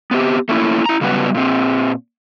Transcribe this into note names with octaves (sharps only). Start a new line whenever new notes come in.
B3 C4 G4
A3 A#3 C#4 E4
E4 A#5
C#3 F#3 G3 B3 B4 F#5
A#2 C4